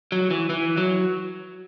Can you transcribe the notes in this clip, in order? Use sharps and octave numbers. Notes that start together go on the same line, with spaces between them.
F#3
E3
E3
F#3